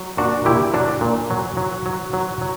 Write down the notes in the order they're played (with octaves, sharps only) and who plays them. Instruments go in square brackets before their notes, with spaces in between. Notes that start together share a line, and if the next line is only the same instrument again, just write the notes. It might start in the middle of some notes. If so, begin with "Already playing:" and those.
Already playing: [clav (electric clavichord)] F#3
A#2 D4 F#4
A#2 E4 G4
F#3 D4 F#4
A#2
F#3
F#3
F#3
F#3
F#3